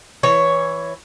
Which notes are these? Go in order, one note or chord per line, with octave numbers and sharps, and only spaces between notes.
E3 C#5